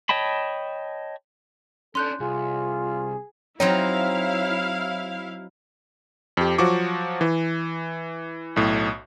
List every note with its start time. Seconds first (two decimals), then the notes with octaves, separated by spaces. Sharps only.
0.09 C#5 D#5 G5 A5 B5
1.95 C#4 D4 A4 C6 F#6 G6
2.20 C2 F4 G#4
3.60 F#3 C4 D#4 E4 C#5 F5
6.37 F2 G4
6.58 F3 F#3 F#4 C#6 D6
7.21 E3
8.56 B1 A2